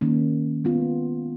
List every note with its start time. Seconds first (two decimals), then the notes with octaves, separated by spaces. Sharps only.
0.01 D#3 A#3 C#4
0.64 G#3 B3 F4